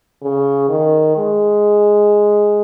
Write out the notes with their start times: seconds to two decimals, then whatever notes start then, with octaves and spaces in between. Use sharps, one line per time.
0.23 C#3
0.69 D#3
1.17 G#3